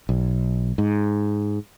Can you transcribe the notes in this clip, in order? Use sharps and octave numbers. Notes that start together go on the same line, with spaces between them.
B1
G#2